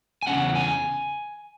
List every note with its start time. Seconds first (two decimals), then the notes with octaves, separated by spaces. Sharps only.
0.23 G#5
0.27 E2 C#3 G#3 C#4 F#5
0.55 G#5